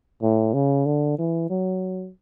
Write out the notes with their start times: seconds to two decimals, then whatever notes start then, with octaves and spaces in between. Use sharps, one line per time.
0.22 A2
0.54 C#3
0.86 D3
1.18 E3
1.50 F#3